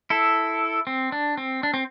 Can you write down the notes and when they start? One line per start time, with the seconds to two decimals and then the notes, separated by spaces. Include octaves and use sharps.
0.10 E4 A4
0.87 C4
1.12 D4
1.38 C4
1.63 D4
1.74 C4